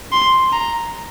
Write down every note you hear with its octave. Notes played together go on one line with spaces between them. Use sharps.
C6
A#5